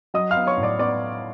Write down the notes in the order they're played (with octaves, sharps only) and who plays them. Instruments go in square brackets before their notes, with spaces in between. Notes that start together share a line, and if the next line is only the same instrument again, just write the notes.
[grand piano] F#3 D#5 D#6
F5 F6
B3
C#5 C#6
A2
D5 D6
B3 D5 D6